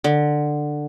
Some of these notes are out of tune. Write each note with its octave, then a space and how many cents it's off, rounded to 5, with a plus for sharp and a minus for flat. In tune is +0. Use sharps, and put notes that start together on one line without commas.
D3 +15